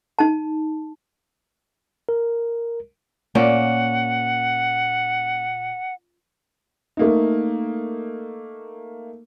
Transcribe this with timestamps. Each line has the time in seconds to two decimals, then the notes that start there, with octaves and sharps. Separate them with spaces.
0.19 D#4 A5
2.09 A#4
3.35 A#2 A#3 C#4 F#5
6.97 A3 A#3 D#4